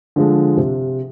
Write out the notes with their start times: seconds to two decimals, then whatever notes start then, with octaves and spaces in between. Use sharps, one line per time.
0.16 D3 F3 G#3
0.57 C3